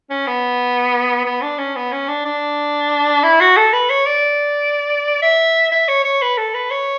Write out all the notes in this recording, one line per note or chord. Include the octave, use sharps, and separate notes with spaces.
C#4
B3
B3
D4
C#4
B3
C#4
D4
D4
E4
F#4
A4
B4
C#5
D5
E5
E5
C#5
C#5
B4
A4
B4
C#5